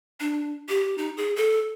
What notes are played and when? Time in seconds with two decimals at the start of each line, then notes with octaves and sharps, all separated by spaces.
0.20 D4
0.69 G4
0.98 D#4
1.17 G#4
1.36 A4